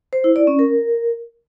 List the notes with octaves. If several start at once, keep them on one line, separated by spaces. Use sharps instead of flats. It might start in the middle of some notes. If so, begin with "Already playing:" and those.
C5
E4
D5
C#4
A#4